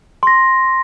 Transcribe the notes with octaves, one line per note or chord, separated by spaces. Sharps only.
C6 A#6